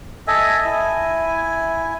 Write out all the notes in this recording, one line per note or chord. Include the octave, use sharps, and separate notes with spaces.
A4 D#5 E5 G#5
E4 G#5